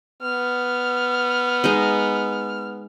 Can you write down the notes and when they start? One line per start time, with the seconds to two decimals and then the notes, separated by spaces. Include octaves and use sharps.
0.22 B3 F6
1.64 G#3 D#4 D#5